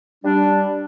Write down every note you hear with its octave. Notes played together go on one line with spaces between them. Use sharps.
G3 D4